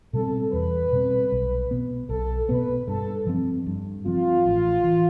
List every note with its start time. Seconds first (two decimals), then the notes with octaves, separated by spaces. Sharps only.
0.13 B2 G3 C4 A4
0.53 E2 B4
0.92 B2 G3 C4
1.32 B1
1.71 B2 B3
2.09 B1 A4
2.49 B2 B3 B4
2.88 G2 A4
3.27 F3 C4
3.66 G2
4.06 F3 C4 F4
4.45 A1
4.84 E3